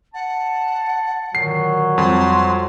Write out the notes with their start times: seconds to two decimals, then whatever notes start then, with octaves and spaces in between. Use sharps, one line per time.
0.14 F#5 A5
1.35 A#2 D3 D#3 F#3 C7
1.98 F2 G3 C6